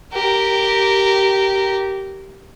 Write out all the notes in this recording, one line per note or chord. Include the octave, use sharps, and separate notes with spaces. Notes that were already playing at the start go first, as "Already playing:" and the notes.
G4 A#4